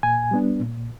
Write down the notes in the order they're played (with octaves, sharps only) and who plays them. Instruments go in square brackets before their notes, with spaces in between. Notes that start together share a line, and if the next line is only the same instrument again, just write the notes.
[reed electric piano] A#2 G#5
G3 B3 D4
A#2